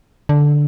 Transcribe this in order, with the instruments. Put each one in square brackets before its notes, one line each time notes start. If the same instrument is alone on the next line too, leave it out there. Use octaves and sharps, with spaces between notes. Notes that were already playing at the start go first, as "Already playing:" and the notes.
[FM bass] D3